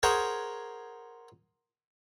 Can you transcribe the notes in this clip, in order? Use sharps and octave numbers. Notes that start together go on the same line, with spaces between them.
G#4 A#4 C5 C#5 F#5 G#5